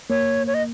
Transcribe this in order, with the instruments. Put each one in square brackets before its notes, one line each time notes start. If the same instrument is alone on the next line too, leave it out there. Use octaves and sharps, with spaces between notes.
[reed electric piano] A#3 [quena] C#5
[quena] C#5
D#5